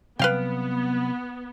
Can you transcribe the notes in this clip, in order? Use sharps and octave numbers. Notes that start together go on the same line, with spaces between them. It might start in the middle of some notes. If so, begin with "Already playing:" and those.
C3 F#3 G3 B3 B4 F5 G5